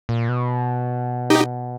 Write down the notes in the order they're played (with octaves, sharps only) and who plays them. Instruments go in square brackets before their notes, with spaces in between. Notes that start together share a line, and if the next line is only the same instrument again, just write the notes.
[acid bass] A#2
B2
[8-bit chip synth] D#4 G4